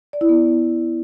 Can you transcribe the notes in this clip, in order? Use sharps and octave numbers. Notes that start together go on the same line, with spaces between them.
D5
E4
B3